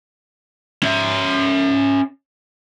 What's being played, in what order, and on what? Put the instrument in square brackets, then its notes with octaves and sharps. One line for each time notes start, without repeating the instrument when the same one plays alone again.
[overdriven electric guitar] C#4 E5